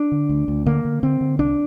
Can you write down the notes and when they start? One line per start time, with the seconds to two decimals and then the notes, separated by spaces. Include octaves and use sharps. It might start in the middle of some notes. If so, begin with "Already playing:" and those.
Already playing: D4
0.12 D3
0.29 D2
0.48 D2
0.66 D3 A#3
0.85 D3
1.03 D3 C4
1.21 D3
1.39 C2 D4